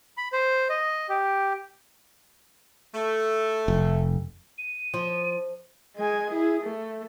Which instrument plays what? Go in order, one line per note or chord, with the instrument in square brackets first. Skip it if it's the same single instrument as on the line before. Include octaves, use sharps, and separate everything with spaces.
[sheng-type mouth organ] B5
C5
D#5
G4
[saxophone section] A3
[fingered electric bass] F1
[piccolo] D#7
[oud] F3
[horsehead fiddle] G#3 G#5
E4 G#4
A3